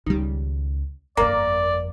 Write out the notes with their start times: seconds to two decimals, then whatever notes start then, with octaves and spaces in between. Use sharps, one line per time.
0.06 C#2 D#3 G3
1.17 G1 F2 A#3 D5 A#5